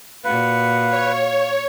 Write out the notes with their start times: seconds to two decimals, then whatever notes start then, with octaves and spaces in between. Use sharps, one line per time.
0.24 A#2 F#4 B4 F5
0.90 C#5